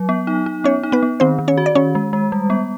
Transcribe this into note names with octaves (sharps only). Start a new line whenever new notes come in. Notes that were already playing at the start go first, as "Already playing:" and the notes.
Already playing: F#3
B3
D#4
D#4
B3 C#4 C#5
D#4
B3 B4
B3
D#3 C4 C5
D#3
C#4 C#5
F#4
D5
D#3 C#4 C#5
G#3
G#3
G3
B3